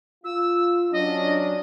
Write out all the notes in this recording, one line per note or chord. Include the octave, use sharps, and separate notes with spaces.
F4 E6
F#3 C#4 D4 D#5